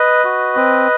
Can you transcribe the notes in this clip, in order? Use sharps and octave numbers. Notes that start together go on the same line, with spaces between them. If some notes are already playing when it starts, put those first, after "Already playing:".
Already playing: B4 D#5
F#4
C4